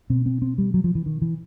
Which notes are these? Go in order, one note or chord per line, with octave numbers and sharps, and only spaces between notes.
B2 C4
C4
C4
G3
F#3
F3
E3
D#3
E3